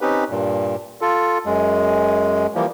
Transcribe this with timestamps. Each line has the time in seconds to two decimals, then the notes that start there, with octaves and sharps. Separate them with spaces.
0.01 C4 C#4 D#4 G4 B4
0.30 G2 A#2
1.01 F4 A4
1.46 F#2 G#3
2.55 E3 F3 G3 A#3